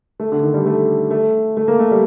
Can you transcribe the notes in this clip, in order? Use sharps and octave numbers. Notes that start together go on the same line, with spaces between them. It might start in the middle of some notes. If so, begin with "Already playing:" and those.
A3
D3
D#3
G3
A3
A3
A3
A#3
A3
G3